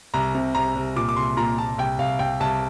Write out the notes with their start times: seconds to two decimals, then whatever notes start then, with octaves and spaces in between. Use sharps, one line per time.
0.14 C2 A#5
0.35 C3
0.55 C2 A#5
0.75 C2
0.96 A#2 D6
1.09 D6
1.16 C2 C6
1.37 A#2 A#5
1.58 A#2 A5
1.78 C2 G5
1.99 C2 F5
2.19 C2 G5
2.40 C2 A5